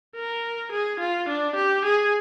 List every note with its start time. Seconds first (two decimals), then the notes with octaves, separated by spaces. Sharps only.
0.15 A#4
0.72 G#4
1.00 F4
1.29 D4
1.56 G4
1.86 G#4